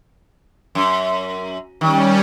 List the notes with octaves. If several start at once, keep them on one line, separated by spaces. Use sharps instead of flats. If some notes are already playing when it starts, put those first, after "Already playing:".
F#2
D#3 G3 C#4